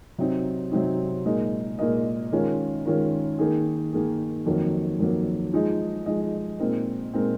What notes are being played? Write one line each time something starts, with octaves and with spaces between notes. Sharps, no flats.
C3 F#3 C4 D#4
C3 F#3 C4 D#4
A#2 G#3 D#4 A#4 D#5
A#2 G#3 D#4 A#4 D#5
D#3 G#3 C#4 F4 A#4
D#3 G#3 C#4 F4 A#4
D#3 A#3 D#4 G#4
D#3 A#3 D#4 G#4
F2 D#3 F#3 A#3
F2 D#3 F#3 A#3
F3 G#3 D#4 G#4 D#5
F3 G#3 D#4 G#4 D#5
A#2 G#3 C4 D#4 A#4
A#2 G#3 C4 D#4 A#4